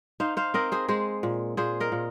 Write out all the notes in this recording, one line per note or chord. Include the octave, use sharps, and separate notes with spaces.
D#4 C5 F5
C5 F5
C4 A#4 D#5
G#4 C5
G#3 G#4 C5
A#2
A#2 G#4 C5
A#4 D#5
A#2